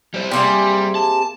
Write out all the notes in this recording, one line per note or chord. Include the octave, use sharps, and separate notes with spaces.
G3 C5
C3 G3 A#3 G#4
A5